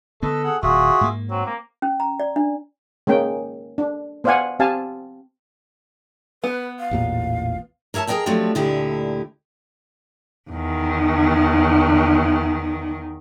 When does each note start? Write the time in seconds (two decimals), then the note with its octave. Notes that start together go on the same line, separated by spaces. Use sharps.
0.23 D3 B3 A4 B4 D#5
0.44 G#4 F#5
0.63 D1 F4 F#4 G#4 E5
1.01 G#2 A#3
1.30 F#3 C4
1.46 A#3
1.82 C#4
2.00 A#5
2.20 D5
2.36 D4
3.07 G#3 A#3 C#4 G5
3.78 D4
4.24 B3 C5 D5 F5 F#5 G#5
4.60 C4 G4 F5 G#5 A5
6.44 B3 B4
6.79 F5
6.91 A1 E2 A#2
7.94 A#4 C#5 E5 G#5 A5
8.07 G#4 A#4 C#5 D#5 G5 A#5
8.26 F3 F#3 A3 C4 D4 G4
8.55 D2 A#2 D3 E4 G4 D#5
10.50 E2 D#3